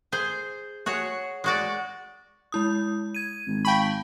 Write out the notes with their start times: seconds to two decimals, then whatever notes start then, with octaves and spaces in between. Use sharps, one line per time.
0.12 G#4 C5
0.86 F#4 G#4 C#5
1.44 G#3 F#4 D5
2.52 G#3 E4 D#6
3.15 G#6 D#7
3.47 G#1
3.65 F5 G5 A5 B5 C#6